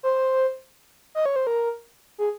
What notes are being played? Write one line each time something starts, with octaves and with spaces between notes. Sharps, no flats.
C5
D#5
C#5
C5
A#4
G#4